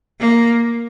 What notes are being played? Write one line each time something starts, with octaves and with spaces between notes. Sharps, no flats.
A#3